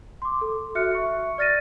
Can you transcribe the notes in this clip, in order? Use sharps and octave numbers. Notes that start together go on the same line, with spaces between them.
C6 D6
A4
F#4 E5 F6 F#6 C#7
E5 C#6
D5 F6 A6 A#6 D#7